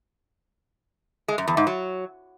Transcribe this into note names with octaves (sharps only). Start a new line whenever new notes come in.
G#3
F#2
E2
G#2
F#3